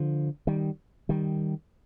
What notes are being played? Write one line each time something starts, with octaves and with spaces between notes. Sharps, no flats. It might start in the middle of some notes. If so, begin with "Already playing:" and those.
Already playing: D3 F3
D#3 G3
D#3 G3